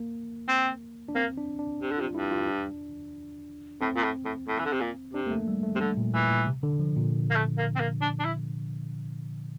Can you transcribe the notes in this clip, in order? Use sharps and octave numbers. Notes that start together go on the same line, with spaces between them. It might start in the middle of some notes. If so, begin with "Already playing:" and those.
Already playing: A#3
C4
D4
A#3 C4
D4
D4
C3
D3
F4
C3
G2 E4
F4
D4
A2 C4
A#2
A2
A2
A2
E3
D3
C3
A#2
C3 D4
A#3
A3
G3
A3
C3
D3 G3
A#2
A#2 E3
A#2
C3
D3
F3
A#2
A#3
A3
A#3
C4
A#3
D4
D4
E4